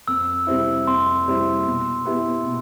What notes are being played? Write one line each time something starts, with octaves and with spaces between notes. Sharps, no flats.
F2 E6
C3 G3 C4 E4
F2 C6
C3 G3 C4 E4
B2
B3 E4 G4
B2